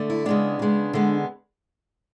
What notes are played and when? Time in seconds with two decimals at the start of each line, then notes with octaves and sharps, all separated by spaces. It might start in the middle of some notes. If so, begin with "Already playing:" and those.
Already playing: D3 A3
0.10 E4
0.26 C#3 G#3 B3 D4
0.59 C#3 G#3 B3
0.93 D3 G#3 B3